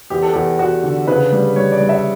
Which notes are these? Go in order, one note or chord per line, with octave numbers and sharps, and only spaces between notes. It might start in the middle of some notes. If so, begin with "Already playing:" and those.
E2 G4
A4
E2 G4
E2 F#4
D3
C#3 B4
G3
G3 C#5
D5
G3
E5